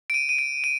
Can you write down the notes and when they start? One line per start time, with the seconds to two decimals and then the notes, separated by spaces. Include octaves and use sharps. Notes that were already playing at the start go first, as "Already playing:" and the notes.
0.10 D7
0.14 D#7
0.29 D#7
0.39 D7
0.64 D#7